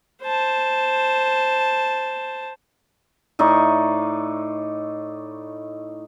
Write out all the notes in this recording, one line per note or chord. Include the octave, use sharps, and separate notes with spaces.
C5 A5
A2 D#4 D5 C#6